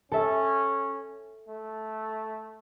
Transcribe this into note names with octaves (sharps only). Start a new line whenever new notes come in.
C#4 A4 E5
A3